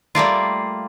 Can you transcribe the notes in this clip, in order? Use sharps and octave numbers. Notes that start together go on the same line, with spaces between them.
G3 A3 A#3 F4